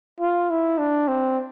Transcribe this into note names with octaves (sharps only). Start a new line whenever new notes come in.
F4
E4
D4
C4